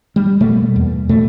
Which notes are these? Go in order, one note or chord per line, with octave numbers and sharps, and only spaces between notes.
G3
B2 G3 A3 A#3
E2
B2 A3